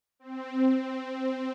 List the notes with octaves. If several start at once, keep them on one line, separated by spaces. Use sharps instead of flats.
C4
C4